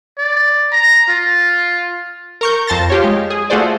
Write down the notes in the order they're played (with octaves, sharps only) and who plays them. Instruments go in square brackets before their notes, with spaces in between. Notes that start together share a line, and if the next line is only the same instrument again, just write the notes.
[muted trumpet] D5
A#5
F4
[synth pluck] A#4 C#6 G6
F2 A5 C6 A6 A#6
F4 G4 C#5
G#3
G#4
A3 F4 F#4 G#4 C5 D5